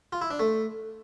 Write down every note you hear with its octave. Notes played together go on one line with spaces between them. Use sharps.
F4
E4
D4
A3